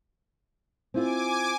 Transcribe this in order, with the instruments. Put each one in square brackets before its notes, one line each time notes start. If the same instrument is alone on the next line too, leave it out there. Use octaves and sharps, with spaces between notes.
[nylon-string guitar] C4 E4 F4 [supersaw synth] G#5 D6